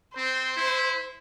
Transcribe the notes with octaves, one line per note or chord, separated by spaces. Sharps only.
C4 C5
E4